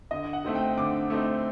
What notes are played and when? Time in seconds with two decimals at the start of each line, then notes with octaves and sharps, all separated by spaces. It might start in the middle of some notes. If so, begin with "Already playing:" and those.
0.11 D3 D#5
0.33 F#5
0.44 A3 C4 D#4
0.55 G5
0.77 D3 D6
1.10 A3 C4 D#4